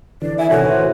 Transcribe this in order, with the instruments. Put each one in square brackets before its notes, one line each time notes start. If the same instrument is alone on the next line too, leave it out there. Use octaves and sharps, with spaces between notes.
[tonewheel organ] D3 E3 [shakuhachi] D5
[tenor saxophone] E4 [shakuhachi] G#5
[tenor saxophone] A2 [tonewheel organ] C3 D#3 E3 [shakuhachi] F#4
[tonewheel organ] B4 C5 G#5